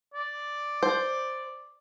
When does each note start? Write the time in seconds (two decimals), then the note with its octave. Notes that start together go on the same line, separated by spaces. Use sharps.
0.14 D5
0.83 C5